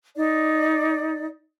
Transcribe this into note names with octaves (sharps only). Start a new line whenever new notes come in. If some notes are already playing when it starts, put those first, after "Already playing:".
D#4 D5